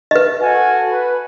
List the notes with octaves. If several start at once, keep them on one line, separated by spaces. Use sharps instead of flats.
B4 D#5
F#4 A4 G#5
B4